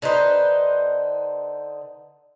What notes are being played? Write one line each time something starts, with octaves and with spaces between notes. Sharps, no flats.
D3 D#4 B4 C5